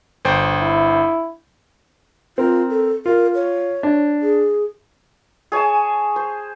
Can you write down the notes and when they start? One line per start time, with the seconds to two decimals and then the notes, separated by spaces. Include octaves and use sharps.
0.25 G1 C5 G5
0.62 E4
2.38 C4 F4 A#4
2.70 A4
3.06 F4 A#4
3.35 C#5
3.83 D4
4.22 G#4
5.52 G#4 C#5 G#5 A5
6.16 C5